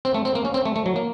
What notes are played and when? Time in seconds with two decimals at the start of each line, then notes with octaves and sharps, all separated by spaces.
0.05 C4
0.14 A3
0.25 C4
0.35 A#3
0.45 C#4
0.54 C4
0.65 A3
0.76 A3
0.86 F#3
0.96 A#3